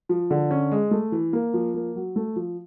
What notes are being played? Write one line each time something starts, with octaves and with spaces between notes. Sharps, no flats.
F3
D3
C#4
G#3
A3
E3
A#3
F3
A#3
F#3
A3
F3